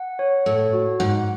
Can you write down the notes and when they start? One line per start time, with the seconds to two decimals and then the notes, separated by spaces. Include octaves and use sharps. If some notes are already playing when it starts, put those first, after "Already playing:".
Already playing: F#5
0.19 C#5
0.46 A2 A4
0.73 F#4
1.00 G#2 F#5